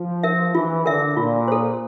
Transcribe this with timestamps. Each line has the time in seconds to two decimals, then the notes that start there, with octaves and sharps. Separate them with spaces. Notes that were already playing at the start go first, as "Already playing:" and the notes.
Already playing: F3
0.23 A#4 E5
0.54 E3 F4
0.86 D3 A#4 E5
1.17 A#2 F4
1.48 A4 C5